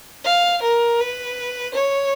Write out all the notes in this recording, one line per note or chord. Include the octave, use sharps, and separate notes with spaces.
F5
A#4
B4
C#5